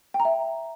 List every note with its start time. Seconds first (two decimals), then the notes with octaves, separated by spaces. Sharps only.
0.14 G5
0.20 A#5
0.25 E5